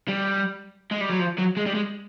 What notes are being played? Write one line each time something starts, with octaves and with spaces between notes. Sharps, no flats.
G3
G#3
G3
F#3
F3
F#3
G#3
G3
G#3